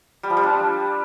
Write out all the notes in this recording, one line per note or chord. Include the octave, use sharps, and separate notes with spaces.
G3
F3
G3
D4